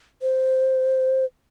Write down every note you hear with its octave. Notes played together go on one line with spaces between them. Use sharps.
C5